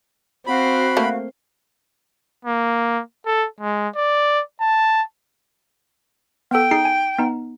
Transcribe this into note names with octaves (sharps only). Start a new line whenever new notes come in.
C4 F#4 F5 B5
A3 A#3
A#3
A4
G#3
D5
A5
B3 A4 G5
D#4 G#4 C7
G#5
B3 D#4